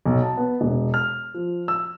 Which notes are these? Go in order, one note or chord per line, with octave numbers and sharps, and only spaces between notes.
B1
A5
B3
E1
F6
F3
E6